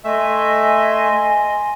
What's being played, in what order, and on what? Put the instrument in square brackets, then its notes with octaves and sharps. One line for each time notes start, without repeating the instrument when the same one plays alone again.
[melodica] A3 E5 [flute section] D#5 G#5 C6